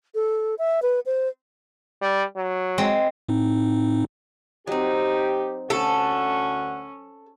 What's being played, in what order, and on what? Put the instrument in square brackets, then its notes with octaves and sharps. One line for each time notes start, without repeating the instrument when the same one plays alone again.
[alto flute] A4
E5
B4
C5
[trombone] G3
F#3
[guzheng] G#3 C4
[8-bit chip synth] A2 C4 D#4
[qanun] F#3 C4 [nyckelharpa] D#4 [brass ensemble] G4
[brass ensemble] D2 F#5 [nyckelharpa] C#4 [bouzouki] A4